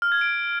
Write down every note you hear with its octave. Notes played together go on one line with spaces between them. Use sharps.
F6
G#6
D7